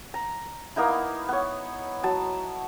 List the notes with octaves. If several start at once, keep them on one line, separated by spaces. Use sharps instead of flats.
A#5
A#3 B3 D#4 E4
B3 C#5
F#3 A5